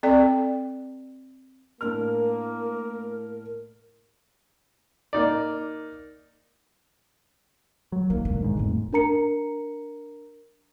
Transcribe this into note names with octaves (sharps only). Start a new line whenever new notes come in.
C4 A4 D5 G5
A2 A#3 D4 A#4 F6
A#3 D#4 D5
F#3
D#3 A#3
E1 D3
G#1 G#2
F2 A2
D4 A#4 A#5 C#7